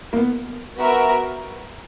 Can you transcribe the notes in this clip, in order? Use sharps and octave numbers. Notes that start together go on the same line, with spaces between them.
A#3
B3
B3 F#4 A#4 E5